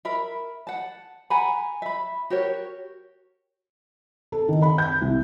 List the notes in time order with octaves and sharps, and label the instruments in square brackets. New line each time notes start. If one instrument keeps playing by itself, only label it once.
[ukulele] A#4 E5 B5
F#5 A5
F#5 G#5 A#5 B5
E5 B5
F#4 G4 A#4 C#5
[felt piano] A4
D#3
B5
G6
C2